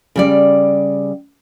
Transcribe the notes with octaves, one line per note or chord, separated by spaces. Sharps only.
C#3 G3 D5